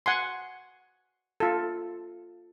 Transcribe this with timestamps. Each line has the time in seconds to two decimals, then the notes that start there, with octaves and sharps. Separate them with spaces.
0.06 F#5 G#5 C6
1.40 F4 A4